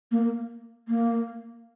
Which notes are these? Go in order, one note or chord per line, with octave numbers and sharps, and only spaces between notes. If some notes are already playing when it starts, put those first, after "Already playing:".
A#3
A#3